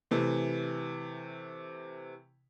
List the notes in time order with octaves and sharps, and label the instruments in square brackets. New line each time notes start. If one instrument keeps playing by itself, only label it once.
[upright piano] C3 E3 A3